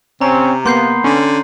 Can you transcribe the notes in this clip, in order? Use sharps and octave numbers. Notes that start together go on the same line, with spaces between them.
C3 C4 C#4 A#5
A#3 B3 C6 G6 C7
D3 C#4